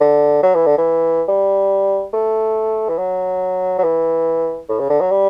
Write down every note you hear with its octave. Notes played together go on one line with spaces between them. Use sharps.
D3
F#3
E3
D3
E3
G3
A3
E3
F#3
F#3
E3
A2
C#3
D3
F#3
G3